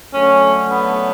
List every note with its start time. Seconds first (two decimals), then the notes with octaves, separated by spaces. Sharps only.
0.14 D3 F#3 A3 C#4
0.71 B3